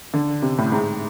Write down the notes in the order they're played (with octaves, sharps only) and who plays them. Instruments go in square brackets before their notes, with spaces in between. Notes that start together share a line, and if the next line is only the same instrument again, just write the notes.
[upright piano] D3
C3
A2
G#2